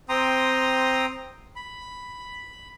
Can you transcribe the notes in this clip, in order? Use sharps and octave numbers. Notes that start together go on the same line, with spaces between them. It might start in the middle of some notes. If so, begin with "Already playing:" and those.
C4 G5 A#5 C6 D#6
B5